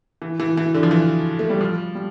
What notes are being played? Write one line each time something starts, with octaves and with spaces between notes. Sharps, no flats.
E3
E3
E3
D3
F3
E3
A3
G3
F3
G3